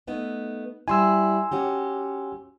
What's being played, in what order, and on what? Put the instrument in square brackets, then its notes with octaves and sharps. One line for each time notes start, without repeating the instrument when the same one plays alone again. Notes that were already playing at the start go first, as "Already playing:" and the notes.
[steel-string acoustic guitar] A3 B3 D#4
[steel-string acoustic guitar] G3 E4 [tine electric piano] G#5 C6 E6
[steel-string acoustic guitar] C#4 F#4 G4